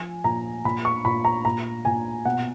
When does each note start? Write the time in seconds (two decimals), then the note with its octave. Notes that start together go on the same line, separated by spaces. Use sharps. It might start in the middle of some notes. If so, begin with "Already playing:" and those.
Already playing: F3 G#5
0.24 A#2 A#5
0.65 A#2 B5
0.85 C#6
1.05 A#2 B5
1.24 A#5
1.45 A#2 A#5
1.85 A#2 G#5
2.25 B2 F#5